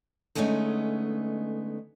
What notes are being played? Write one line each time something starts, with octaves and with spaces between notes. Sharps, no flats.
D3 G#3 A3 B3 C#4 D#4